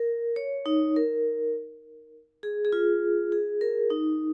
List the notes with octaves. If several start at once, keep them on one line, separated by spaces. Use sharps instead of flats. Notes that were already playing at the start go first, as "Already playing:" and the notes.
Already playing: A#4
C#5
D#4
A#4
G#4
G#4
F4
G#4
A#4
D#4